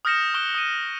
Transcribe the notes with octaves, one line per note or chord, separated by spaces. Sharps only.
D#6 F6 G6 A#6 C#7 E7
C#6 F6 F#6 D7 E7 G7
D#6 D#7